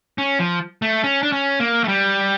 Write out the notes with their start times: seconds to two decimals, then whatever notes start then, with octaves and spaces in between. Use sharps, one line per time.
0.18 C#4
0.39 F3
0.82 A3
1.04 C#4
1.23 D4
1.32 C#4
1.60 A#3
1.84 A3
1.88 G3